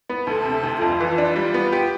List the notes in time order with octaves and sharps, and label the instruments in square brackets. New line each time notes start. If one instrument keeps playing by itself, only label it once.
[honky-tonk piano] B3
[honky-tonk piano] D2 [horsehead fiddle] A4
[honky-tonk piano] C3
D2
[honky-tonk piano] F2 [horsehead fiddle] F4
[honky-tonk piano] E3
D4
G3
B3
G4